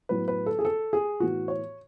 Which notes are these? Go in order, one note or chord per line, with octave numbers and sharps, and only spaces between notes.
A2 F#3 B3 B4
B4
A4
G#4
A4
G#4
A2 E3 B3 F#4
C#5